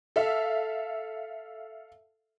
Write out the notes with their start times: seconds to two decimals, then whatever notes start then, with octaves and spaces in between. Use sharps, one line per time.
0.16 A4 E5 F5